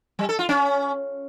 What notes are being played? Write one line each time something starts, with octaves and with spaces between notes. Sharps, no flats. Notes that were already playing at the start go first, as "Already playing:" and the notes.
G3
A4
F4
C#4